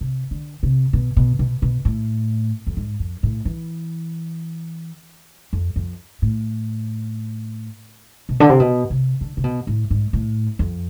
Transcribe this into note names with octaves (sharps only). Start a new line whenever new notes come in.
C3
D3
C3
B2
B2
B2
B2
A2
F2
G#2
F2
A2
E3
F2
F2
A2
B2
D3
C3
B2
C3
D3
C3
B2
A2
G#2
A2
F2